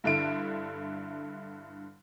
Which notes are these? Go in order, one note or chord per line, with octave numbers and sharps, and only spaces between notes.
G2 D3 E4 D7